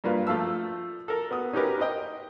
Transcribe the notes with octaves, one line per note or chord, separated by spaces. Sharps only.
G2 A#3 F4 B4
F3 A3 F5 A5 E6
A4 A#4
B3 F#4 D#6
C#4 D#4 F#4 G4 A#4 B4
C5 D#5 G5